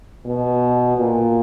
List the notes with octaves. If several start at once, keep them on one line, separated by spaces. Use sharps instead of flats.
B2
A#2